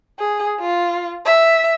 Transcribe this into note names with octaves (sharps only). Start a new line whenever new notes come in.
G#4
F4
E5